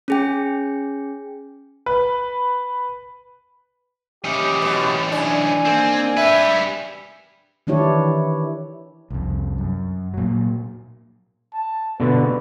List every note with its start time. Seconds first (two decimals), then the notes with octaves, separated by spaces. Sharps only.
0.08 C#4 G#4 G5
1.86 B4
4.24 E3 C#4 D#4 G4
4.62 B2
5.12 D4 G#5
5.65 D#3 A#3 C4
6.17 G4 B4 E5
7.67 D#3 E3 D4 E4 G4 C#5
9.10 C2 F2
9.58 F#2
10.14 A#2 F#3
11.53 A5
12.00 B2 D3 B4